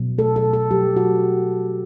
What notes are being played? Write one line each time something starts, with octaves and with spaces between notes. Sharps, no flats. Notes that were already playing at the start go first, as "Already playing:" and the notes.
Already playing: B2 F#3
A3 A4
A4
B2
A4
F#3 G4
B2 F#4